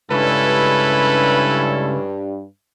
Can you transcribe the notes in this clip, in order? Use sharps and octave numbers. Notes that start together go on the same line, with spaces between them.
C#2 G2 C#4 E4 A4 B4